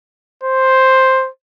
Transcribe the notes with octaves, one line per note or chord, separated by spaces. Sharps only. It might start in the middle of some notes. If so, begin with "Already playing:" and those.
C5